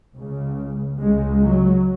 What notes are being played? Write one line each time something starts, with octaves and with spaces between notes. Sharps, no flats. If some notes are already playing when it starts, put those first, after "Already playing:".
C#2 C#3
C#2 C#3 G#3
F#3